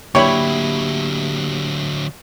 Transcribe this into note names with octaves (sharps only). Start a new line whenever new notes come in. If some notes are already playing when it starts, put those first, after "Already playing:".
D3 F#3 G3 A#3 E4 G4 C#5 B5